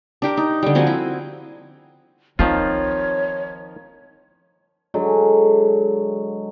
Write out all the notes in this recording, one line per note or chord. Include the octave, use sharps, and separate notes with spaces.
D4 G4 A#4
D#4
D3 G3
F3 C4 F#4 G#5
E4
D#3 F3 C4 D#4 F4 C#5
D3 F#3 G#3